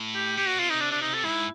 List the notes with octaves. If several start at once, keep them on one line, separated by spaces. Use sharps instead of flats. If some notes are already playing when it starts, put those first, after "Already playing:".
Already playing: A2
G4
A#2 G4
F#4
C3 F4
D#4
D4
D4
D#4
A4
G#2 E4